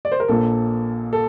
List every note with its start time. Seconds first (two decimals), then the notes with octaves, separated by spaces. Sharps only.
0.05 D5
0.12 C5
0.20 A#4
0.28 A#1 A#2 A4
1.13 A4